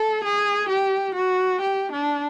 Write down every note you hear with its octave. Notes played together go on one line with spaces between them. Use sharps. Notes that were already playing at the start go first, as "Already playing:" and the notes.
Already playing: A4
G#4
G4
F#4
G4
D4